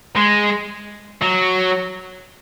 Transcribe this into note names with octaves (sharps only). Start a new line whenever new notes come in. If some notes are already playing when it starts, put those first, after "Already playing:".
G#3
F#3